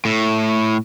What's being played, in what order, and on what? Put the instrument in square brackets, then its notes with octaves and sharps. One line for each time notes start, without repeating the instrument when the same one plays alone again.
[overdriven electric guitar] A2